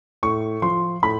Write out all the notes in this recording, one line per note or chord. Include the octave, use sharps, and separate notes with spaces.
A2 C#6
F3 C6
A2 B5